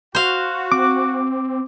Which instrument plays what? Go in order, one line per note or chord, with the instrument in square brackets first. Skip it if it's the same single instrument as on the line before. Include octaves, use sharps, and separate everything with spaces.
[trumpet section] F#4 [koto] C5 F5
[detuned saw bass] C4 [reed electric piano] D6